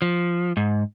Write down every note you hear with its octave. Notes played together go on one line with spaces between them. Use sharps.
F3
G#2